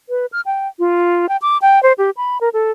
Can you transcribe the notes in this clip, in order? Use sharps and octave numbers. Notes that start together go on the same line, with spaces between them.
B4
F6
G5
F4
G5
D6
G5
C5
G4
B5
A#4
A4